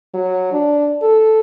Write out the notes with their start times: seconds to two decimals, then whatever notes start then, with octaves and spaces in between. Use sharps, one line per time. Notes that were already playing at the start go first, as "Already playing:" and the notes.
0.14 F#3
0.53 D4
1.02 A4